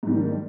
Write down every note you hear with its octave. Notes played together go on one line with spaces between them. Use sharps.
G#2 D#3 G3 A#3 D4